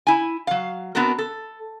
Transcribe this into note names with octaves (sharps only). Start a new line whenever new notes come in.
E4 G#5
F#3 F5
B3 C4 D4 F#4 A#4
A4